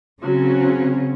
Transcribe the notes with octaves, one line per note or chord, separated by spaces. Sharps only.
C#3 F#3 C4 C#4 F#4